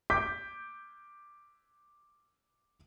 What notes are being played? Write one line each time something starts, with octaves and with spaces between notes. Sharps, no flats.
D6 G6 B6